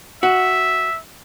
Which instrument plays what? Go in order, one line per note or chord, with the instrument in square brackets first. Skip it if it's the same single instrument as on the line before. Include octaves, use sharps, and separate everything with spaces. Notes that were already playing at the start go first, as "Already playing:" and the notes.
[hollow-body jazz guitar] F#4 [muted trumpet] E5